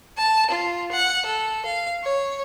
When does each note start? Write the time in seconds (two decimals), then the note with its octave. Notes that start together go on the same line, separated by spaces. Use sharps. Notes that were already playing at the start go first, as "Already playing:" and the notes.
0.17 A5
0.50 F4
0.91 F#5
1.25 A4
1.65 F5
2.03 C#5